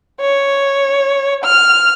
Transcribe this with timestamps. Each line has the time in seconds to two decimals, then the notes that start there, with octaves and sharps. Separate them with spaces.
0.21 C#5
1.44 F6